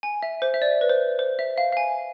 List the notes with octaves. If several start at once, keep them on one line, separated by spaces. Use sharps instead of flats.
G#5
E5
C5
E5
D5
B4
C5
C5
E5
F5
F5
G#5